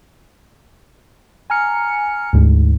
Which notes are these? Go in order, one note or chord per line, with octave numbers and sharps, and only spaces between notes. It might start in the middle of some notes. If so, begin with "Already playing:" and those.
G#5 A#5 F6 C#7
D2 G#2